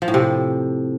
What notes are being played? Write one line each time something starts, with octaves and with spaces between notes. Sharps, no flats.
F3
A2
C3